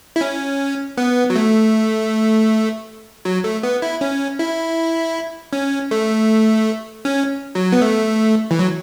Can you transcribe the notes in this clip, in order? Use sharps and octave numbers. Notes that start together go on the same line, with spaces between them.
E4
C#4
B3
F#3
A3
F#3
A3
B3
E4
C#4
E4
C#4
A3
C#4
F#3
B3
A3
E3
F#3